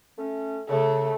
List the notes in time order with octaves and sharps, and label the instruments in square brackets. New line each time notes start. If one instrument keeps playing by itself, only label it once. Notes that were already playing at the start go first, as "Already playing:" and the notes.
[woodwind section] A3 C#4
[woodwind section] C#3 [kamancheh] A3